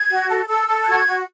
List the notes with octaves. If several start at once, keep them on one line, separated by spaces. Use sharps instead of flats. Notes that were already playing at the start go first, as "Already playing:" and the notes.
Already playing: G#6
F#4
A4
A4 E6
A4
F#6
F#4 G#6
F#4